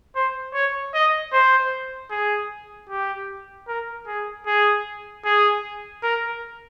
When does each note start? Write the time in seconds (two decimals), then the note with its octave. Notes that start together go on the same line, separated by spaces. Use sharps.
0.15 C5
0.54 C#5
0.94 D#5
1.33 C5
2.11 G#4
2.89 G4
3.68 A#4
4.07 G#4
4.46 G#4
5.25 G#4
6.03 A#4